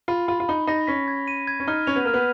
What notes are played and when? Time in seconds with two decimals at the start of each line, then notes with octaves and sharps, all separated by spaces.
0.08 F4 B5
0.28 F4 B5
0.40 F4
0.48 D#4 B5
0.67 D#4 A#6
0.87 C#4 B6
1.08 G#6
1.28 D#7
1.47 G#6
1.60 C#4
1.68 D#4 F6
1.87 C#4 F7
1.96 B3
2.05 A#3 F6
2.14 B3